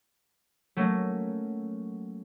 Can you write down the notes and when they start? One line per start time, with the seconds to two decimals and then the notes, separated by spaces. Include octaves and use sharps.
0.77 F#3 A3 A#3 C#4